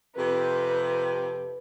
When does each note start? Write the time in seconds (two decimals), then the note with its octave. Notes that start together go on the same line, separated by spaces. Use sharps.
0.17 F2 C3 B4